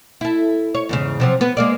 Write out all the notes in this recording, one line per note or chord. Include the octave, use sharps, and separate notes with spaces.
E4 A4
C#5
E2 G#2 C#3
C3 F3 F#3
B3 B4
G#3 A#3 D5